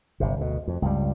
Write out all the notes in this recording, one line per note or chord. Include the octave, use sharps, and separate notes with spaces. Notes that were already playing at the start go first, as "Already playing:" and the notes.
G1 C3
D2 B2
F2
C#2 G2 G3